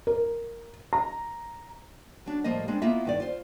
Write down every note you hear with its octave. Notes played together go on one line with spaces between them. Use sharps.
A#4
A#5
F#3 D4
A2 F3 G3 A#3 D#5
G3 G#3 C4 D4
A#3 B3 E4 F4 D#5 E5
G2 D#3 D5
F4 C5